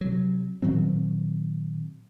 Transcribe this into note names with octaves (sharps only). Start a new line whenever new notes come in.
C3 F#3
A#2 D#3 F#3 C4